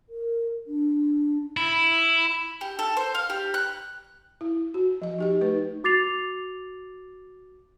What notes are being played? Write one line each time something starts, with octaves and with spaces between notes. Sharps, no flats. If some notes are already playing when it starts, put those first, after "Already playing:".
A#4
D4
E4
G4
A4
C5
F5
G4
F#6
E4
F#4
F3 D#5
D#4 G4 D#5
A3 D#4 B4
F#4 D6 A6 C7 F7